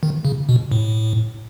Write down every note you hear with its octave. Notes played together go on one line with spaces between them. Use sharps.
D#3
C#3
B2
A2